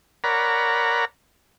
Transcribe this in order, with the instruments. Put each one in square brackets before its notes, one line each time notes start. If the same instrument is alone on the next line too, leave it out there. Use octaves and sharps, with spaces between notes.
[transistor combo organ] A#4 C#5 D5 F#5 A#5 B5